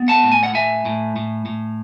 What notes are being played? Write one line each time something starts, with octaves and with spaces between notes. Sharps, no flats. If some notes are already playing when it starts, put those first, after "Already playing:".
Already playing: B3
F#5 A5
A2
G#5
F#5
A2 E5 G#5
A2
A2
A2